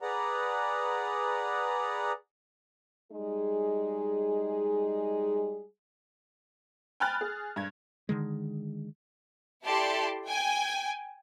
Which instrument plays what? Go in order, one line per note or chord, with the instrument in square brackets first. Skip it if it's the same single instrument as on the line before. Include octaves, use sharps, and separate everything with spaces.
[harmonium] G#4 B4 D5 F#5 A#5
[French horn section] G3 G#3 D#4 G#4
[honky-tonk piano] G5 G#5 B5 F6 F#6 A6
G#4
G2 G#6
[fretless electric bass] D3 D#3 G#3
[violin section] E4 G4 A4 D5 A5 C6
G5 G#5